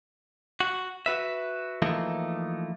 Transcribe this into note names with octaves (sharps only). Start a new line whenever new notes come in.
F#4
F#4 B4 E5
E3 F3 A3 A#3 D#4